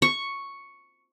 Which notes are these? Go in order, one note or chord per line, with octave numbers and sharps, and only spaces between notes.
C#6